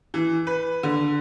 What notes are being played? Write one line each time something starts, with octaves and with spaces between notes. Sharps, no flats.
E3
B4
D3